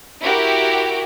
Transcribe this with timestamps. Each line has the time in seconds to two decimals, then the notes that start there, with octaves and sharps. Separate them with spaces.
0.22 E4 F#4 G4 A#4